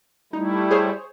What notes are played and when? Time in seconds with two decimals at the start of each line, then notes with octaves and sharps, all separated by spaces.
0.33 G3 A3 D#4 E4
0.71 G#4 C5 C#5